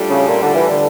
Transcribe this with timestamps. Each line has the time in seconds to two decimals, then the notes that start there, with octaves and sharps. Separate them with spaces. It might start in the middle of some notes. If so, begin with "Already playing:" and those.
Already playing: A2 G3 D4 F4 A4
0.09 C#3
0.28 A#2
0.41 D3
0.55 E3
0.69 D3